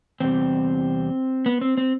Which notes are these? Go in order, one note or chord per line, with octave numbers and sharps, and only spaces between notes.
E2 C3 G3 C4
B3
C4
C4